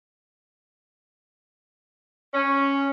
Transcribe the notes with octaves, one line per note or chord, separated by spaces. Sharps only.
C#4